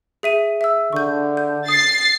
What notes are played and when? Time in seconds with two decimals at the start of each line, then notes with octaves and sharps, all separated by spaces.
0.23 G#4 E5 D#7
0.61 E5 E6
0.93 D3 C#6 G6
1.37 G6
1.68 D#6 A6 C7